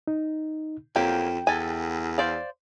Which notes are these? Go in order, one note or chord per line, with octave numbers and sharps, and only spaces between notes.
D#4
F2 F#3 A#3 G4 G5
E2 A4 G#5
C5 D5 F5